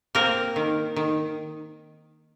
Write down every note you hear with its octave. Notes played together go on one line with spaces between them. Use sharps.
A#3 C4 A#4
D#3
D#3